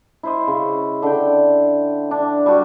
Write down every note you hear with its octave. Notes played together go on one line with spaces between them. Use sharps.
E4 C5 D#5
C#3
D3 G5
D4
G3 D4 F#4